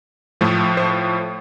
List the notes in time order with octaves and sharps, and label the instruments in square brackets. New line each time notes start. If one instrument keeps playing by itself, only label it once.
[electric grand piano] A2 F3 A3
C5